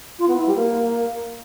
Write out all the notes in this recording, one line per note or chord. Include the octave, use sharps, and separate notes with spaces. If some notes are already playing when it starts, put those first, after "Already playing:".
F4
B3
E4
G3
A#3